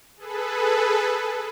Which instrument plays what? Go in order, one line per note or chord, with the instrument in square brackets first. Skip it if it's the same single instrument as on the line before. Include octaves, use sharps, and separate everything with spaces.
[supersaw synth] G#4 A4 B4